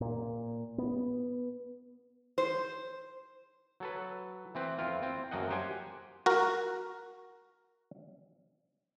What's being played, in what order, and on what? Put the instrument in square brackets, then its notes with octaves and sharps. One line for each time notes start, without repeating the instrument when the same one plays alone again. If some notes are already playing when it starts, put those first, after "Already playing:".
[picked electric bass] A#2
B3
[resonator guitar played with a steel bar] C5
[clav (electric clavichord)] F#3 A4 B4
E3 C4 B4
F2 E4 F4
C4
F#2 A#3 A4 D#5 F#5
G4 C5 F#5 G#5
F#4 A#4